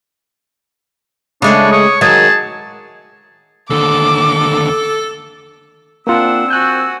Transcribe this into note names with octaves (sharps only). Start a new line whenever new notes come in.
C#3 G#3 A3 D4 C#5
C#5 D#6
D#3 F#3 G#3 G#4 A5
D#2 D3 A4 D6
A#3 C4 D4 F4 F#5 E6
F#4 G#5 F#6 G6